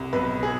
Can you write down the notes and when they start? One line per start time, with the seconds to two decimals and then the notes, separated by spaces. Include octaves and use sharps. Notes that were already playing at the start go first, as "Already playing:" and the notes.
Already playing: C2
0.13 B1 B4
0.43 G#4